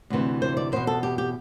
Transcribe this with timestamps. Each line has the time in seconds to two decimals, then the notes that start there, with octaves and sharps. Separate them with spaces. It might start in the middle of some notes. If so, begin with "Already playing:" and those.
0.10 D2 C3 E3
0.42 C5
0.57 D5
0.72 E2 B2 C5
0.87 A4
1.03 G4
1.18 G4